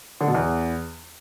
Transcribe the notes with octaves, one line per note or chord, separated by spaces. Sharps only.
D3
B2
E2